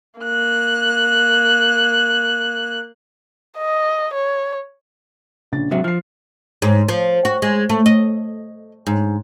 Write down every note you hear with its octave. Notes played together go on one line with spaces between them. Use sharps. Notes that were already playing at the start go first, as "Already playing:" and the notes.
A#3 F#6
D#5
C#5
A#1 C#3 A6
G#2 C3 F#3 E5
F3 F6 C7
G#2
F3
F#4
G#3
A3
D#5
G#2